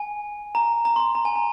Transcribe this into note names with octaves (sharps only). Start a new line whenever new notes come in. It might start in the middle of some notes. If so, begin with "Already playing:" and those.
Already playing: G#5
A#5
A#5
C6
A#5
A#5
G#5
A#5